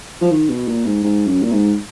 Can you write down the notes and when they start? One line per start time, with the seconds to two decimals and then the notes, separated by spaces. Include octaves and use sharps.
0.21 F3
0.31 D#3
0.49 B2
0.68 A#2
0.85 G#2
1.03 G#2
1.27 F#2
1.42 A#2
1.52 G#2